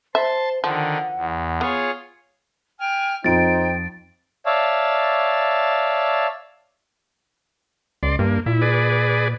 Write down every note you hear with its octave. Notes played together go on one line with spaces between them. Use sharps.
C5 E5 A5 C6
D3 D#3 F3 F#5
E2
B3 F4 G#4 C#5
G5 G#5 F6
F2 D#4 C5 G5 A6 D7
C#5 D5 E5 F5 A5
C#2 D5 C6
G2 A#3
A#2 E4
G#4 B4 D5